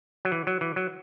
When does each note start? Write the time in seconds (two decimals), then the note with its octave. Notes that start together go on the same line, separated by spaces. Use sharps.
0.25 F#3
0.32 E3
0.47 F#3
0.61 E3
0.76 F#3